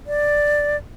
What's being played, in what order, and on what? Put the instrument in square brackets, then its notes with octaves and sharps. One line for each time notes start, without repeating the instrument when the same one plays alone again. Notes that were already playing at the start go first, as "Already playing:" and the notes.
[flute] D5